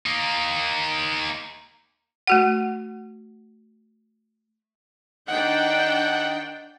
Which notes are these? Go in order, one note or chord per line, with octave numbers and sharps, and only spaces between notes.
A#3 D#4
A3 F#4 F#5
D#3 D4 D#4 D#5 F#5 G5